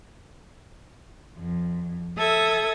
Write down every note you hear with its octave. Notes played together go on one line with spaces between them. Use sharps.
F2
A4 E5 D#6 G#6